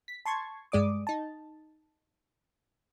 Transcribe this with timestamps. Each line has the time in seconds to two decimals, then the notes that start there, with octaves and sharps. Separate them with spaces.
0.08 B6
0.26 A5 C6 C#6 G#6
0.72 G2 G#3 D5 D6 D#6
1.07 D#4 A5